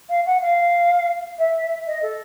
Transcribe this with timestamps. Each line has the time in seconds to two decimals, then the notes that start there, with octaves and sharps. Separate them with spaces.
0.09 F5
0.26 F#5
0.42 F5
1.38 E5
1.87 D#5
2.02 A4